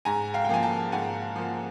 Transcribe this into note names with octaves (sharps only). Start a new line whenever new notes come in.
G#2 G#5 A#5
F5 G5
G5
F3 A#3 G#5
G5 A5
G#2 F#5 G#5
F3 A#3